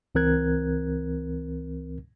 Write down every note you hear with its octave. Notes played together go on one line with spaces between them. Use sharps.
C#2 E3 C4 A#4 F#6 G#6